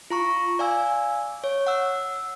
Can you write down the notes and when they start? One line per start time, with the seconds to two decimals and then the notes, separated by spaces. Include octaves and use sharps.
0.10 F4 A#5 C#6
0.59 D5 F5 G#5 E6
1.44 C#5
1.67 F#5 E6